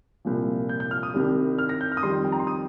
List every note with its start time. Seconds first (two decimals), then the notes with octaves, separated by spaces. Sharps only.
0.25 C2 A#2 F3
0.69 G6
0.80 G6
0.91 F6
1.03 D#6
1.14 C2 C3 D#3 G3
1.58 F6
1.69 A#6
1.81 G6
1.92 F6
1.97 D#6
2.03 F2 D#3 G3 C6
2.24 G5
2.32 A#5
2.40 C6
2.47 D#6